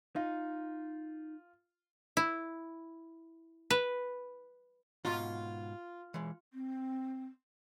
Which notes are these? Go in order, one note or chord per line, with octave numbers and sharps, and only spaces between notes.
D#4 F4
E4
B4
G#2 B2 F4 A#5
E3 G#3
C4